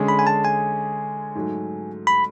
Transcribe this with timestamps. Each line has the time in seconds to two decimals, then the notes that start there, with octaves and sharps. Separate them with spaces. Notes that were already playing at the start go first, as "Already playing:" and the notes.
Already playing: D3 G#3 C#4 G#4
0.08 B5
0.19 G#5
0.27 A5
0.45 G#5
1.35 G#2 F#3 A3
2.07 B5